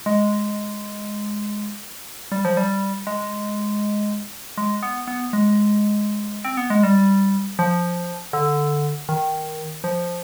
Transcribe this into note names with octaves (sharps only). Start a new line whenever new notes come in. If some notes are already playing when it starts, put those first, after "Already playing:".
G#3
G3
F3
G3
G#3
G#3
B3
B3
G#3
C4
B3
G#3
G3
F3
D3
D#3
F3